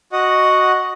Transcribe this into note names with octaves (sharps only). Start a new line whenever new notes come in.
F#4 D#5 F#5